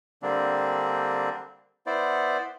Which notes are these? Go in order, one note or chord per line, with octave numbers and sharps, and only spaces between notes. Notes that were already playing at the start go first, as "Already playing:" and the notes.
D3 G3 A#3 C4 D4
B3 E4 C5 D5